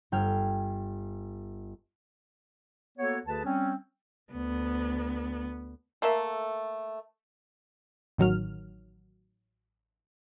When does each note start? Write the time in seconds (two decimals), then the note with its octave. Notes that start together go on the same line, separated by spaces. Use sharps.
0.12 G1 G5 F6 G#6
2.98 A#3 B3 F#4 A4 C#5
3.26 D2 D3 G#4 B4 A5
3.44 G3 C4 C#4
4.33 D2 B3
6.02 A3 A#3 A4 E5
8.18 A1 D#3 F#3 F6